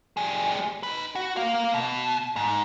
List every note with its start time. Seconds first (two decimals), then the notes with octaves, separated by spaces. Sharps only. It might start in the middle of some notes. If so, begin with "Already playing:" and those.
0.17 G3 G#4
0.83 D#4 B4
1.15 F#4
1.37 A#3 F5
1.74 B2
2.36 G#2